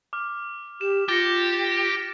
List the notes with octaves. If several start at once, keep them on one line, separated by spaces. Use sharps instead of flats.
D6 F6
G4 E7
F4 G4 A6 A#6 C#7